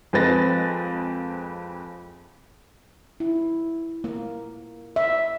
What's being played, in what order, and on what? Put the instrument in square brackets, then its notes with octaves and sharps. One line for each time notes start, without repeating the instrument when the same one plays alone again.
[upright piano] F2 G#3 C4 B4 A6 A#6
[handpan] E4
A#3
E5